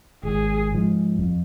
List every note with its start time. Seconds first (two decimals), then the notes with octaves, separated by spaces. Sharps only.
0.23 G#1 G#4
0.71 G#2 F3
1.19 F2